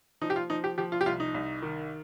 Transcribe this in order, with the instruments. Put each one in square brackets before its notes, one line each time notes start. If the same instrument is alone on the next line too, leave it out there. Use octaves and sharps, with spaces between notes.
[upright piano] F3 D#4
G4
F4
F3 D#4
G4
F3 G4
F4
G4
C2 F4
D#4
C2
D#3